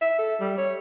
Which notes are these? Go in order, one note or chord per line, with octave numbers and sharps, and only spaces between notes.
E5
A4
G3
C#5